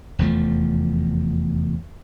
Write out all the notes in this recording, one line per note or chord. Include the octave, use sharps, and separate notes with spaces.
F1 E2 F3 A3